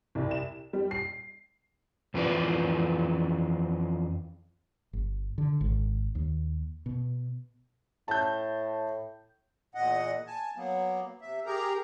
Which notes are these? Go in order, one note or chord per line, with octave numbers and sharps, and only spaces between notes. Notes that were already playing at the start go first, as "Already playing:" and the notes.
C2
E7
G3
C7
F2 E3 B3 F4 B4 D5
G1
D3
G#1
D#2
B2
A2 A5 G6
E2 A#2 D#5 F#5
G#5 A5
F#3 A#3 B3
C3 E5
G4 G#4 A#4 A#5